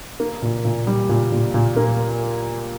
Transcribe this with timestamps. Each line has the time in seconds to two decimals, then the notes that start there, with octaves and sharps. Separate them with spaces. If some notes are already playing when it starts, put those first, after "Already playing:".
0.20 A#3
0.42 A#2
0.65 A#2
0.87 G3
1.09 A#2
1.32 A#2
1.54 A#2
1.76 A#3